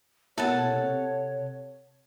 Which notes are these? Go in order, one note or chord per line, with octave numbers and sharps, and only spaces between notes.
B2 A#3 E4 A4 C#5 F#5 A5
C3